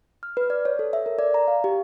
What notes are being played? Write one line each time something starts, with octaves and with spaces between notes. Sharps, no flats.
F6
B4
D5
C#5
A4
E5
A#4
D5
A#5
F5
G4